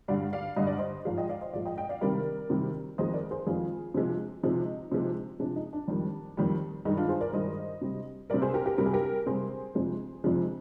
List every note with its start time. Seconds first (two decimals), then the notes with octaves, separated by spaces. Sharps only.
0.08 G2 D3 G3 D5 F5
0.33 D5 F5
0.56 G2 D3 G3 D#5
0.67 D5
0.78 C5 D#5
1.05 G#2 F3 G#3 D5 F5
1.18 D#5 G5
1.29 D5 F5
1.41 C5 D#5
1.53 G#2 F3 G#3 D5 F5
1.65 D#5 G5
1.78 D#5 G5
1.89 D5 F5
2.01 C3 D#3 G3 A#4 D5
2.50 C3 D#3 G3
2.98 F2 D#3 G#3 C5 D#5
3.14 A#4 D5
3.31 G#4 C5
3.47 F2 D#3 G#3 F4 G#4
3.94 C3 F3 G#3
4.43 C3 F3 G#3 D#4
4.92 C3 F3 G#3
5.40 C3 F3 G#3 D4
5.56 D#4
5.73 D4
5.88 F2 D#3 G3
6.37 F2 D#3 G3
6.85 G2 D#3 G#3 D#4
6.97 D4 F4
7.09 G#4 C5
7.21 A#4 D5
7.33 G2 D#3 G#3 C5 D#5
7.81 C3 G3
8.30 C3 G3 A#4 D5
8.42 G#4 C5
8.54 G4 A#4
8.66 G4 A#4
8.78 C3 G3 A#4
8.86 G#4
8.93 G4 A#4
9.27 C3 G3 G#4 C5
9.75 F2 C3 F3 G#3
10.24 F2 C3 F3 G#3